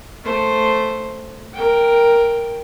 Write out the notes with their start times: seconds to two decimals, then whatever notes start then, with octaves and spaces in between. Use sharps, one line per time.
0.24 A3 C5
1.54 A#4 G5